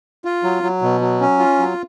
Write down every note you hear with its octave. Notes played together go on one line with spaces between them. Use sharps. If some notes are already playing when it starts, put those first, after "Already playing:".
F4
F#3
F#3
B2
F#3
C#4
F4
F#3